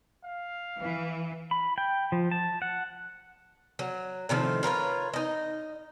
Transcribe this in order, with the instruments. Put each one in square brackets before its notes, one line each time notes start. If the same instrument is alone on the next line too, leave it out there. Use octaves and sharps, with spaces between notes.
[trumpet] F5
[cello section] E3
[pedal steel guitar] B5
G5
F3
A5
F#5
[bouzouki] F#3
A2 C3 D#3 F3
F4 A#4 B4 C#5
D#4 D#5